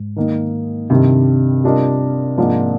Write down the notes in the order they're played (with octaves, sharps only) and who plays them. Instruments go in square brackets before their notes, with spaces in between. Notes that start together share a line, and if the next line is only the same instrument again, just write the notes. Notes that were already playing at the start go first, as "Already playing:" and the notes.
Already playing: [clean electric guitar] G#2
[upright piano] D#3 A#3 D#4
[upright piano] G2 D#3 G3 [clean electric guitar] C3
[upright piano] G3 D4 F4 A#4 D#5
G#2 F3 A#3 D4 F4